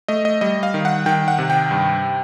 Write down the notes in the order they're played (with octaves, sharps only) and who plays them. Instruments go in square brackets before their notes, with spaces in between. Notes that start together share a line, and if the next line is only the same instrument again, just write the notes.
[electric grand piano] A3 D#5
D#5
G3 D#5
F5
D#3
F#5
D#3 G5
F#5
C3
G5
G2